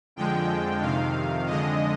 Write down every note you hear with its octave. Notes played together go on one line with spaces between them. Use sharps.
F2 D3 F3 G#3 G5
F2 C3 D#3 F5
F2 D3 G#3 D#5